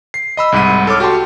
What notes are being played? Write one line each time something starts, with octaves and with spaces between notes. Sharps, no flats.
C7
D#5 B5 E6
C2 G#2 F#5 B5 D#7
A4 C#5 D6 F6
F#4 G4 F#5 G5 A5 C6